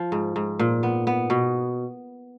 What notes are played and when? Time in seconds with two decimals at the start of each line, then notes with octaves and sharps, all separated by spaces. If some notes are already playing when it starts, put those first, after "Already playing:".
Already playing: F3
0.12 G#2
0.36 G#2
0.59 A#2
0.83 B3
1.07 B3
1.30 B2